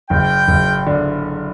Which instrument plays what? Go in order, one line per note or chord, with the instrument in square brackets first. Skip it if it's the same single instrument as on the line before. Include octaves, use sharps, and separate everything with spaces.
[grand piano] F#1 [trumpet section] G5
[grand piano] F#1
D3